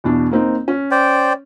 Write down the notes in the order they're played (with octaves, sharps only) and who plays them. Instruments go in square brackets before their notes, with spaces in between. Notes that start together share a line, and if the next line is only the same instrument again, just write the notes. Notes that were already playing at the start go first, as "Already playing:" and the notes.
[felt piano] E2 B2 D4
A#3 C4 D#4
C#4
[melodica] C5 D5 G5